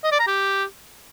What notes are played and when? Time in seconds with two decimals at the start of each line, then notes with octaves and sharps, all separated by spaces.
0.04 D#5
0.12 D5
0.20 A#5
0.27 G4